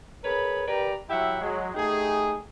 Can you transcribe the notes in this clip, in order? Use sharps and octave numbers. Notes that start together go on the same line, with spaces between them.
G#4 A#4 B4 C#5 B5
G4 A#4 B4 D5 A#5
F#3 E4 G4 E5 F#5
F#3 G#3
A3 D#4 G4 G#4